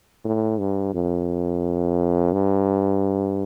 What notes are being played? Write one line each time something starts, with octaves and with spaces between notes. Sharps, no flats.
A2
G2
F2
G2